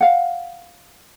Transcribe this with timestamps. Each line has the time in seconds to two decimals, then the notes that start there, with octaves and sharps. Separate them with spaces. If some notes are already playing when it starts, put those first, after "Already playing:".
0.01 F5 F#5